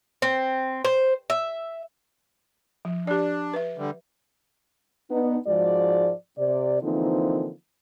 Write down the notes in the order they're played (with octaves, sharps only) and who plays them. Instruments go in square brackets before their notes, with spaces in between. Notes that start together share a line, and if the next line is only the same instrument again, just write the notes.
[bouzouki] C4
C5
E5
[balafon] F3
[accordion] D4 [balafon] G4 D5
[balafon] B4 E5
[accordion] D3 G3
[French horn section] B3 D4 D#4
G#2 F3 G#3 F#4 D5
C3 D5
D3 E3 F3 A#3 C4 D#4